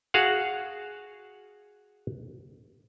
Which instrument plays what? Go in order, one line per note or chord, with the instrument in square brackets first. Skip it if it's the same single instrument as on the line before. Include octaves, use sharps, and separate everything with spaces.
[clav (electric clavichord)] F#4 G#4 F5 F#5